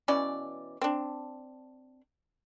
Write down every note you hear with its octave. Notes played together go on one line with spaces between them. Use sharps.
B2 E3 C#4 D5
C4 D4